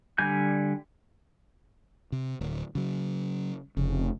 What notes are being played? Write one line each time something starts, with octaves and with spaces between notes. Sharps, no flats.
D3 G3 G#5 G6
C3
D1
C#3 F#3
F1 C#3